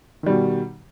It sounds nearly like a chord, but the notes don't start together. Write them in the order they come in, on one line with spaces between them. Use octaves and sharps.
D#3 G3 B2